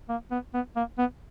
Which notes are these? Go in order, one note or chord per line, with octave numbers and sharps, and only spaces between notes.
A#3
B3
B3
A#3
B3